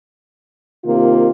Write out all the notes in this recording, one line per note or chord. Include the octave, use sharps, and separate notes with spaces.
C3 D#3 A#3 F4